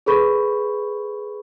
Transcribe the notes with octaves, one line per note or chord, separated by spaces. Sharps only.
G#4 A4 B4 B5 C#6 G6